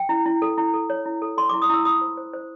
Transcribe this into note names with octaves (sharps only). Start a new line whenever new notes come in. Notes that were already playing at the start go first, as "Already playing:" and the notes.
Already playing: G5
E4
E4
A4
E4
A4
C#5
E4
A4
A4 C6
E4 D6
D#6
E4 E6
F4 D#6
C5
C5
C5